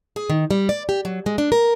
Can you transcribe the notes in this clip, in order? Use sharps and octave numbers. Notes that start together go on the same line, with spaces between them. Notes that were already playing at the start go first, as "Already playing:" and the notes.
G#4
D#3
G3
D5
G4
F#3
G#3
D4
A#4